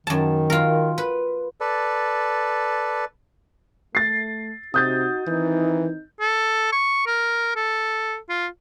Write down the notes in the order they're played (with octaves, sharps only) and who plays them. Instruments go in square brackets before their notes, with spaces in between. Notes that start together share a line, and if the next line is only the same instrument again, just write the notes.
[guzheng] F#2 A5 [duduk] D#3
[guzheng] F4 A#4
B4
[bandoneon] A4 B4 D5
[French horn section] A3 [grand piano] A6 C7
[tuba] C3 [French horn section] D#4 F#4 [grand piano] D#6 G6 A6
[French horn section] D#3 C4 D#4 [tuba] E3
[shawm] A4
C#6
A#4
A4
F4